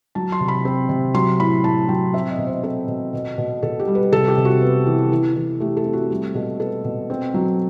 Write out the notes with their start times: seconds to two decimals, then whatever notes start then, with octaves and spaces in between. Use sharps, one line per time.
0.15 F#3 A5
0.32 C6
0.40 C3
0.48 B5
0.65 C4
0.89 C3
1.14 F#3 C6
1.40 A2 B5
1.64 A2 A5
1.89 F#3 G5
2.14 C4 E5
2.31 D#5
2.38 B2
2.47 C5
2.63 C4 A4
2.88 B2
3.13 B2
3.38 B2
3.63 B2 A4
3.80 G4
3.87 G3
3.95 B4
4.12 C3 A4
4.28 G4
4.37 C3
4.45 F#4
4.61 B3
4.86 E3
5.12 E3
5.35 E3
5.60 A3 G4
5.77 A4
5.85 C4
5.93 F#4
6.10 G3
6.35 B2 A4
6.60 B3 A4
6.85 B2
7.10 C4
7.34 F#3